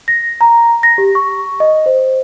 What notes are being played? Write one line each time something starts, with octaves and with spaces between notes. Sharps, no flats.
A#6
A#5
A#6
G4
C#6
D#5
C5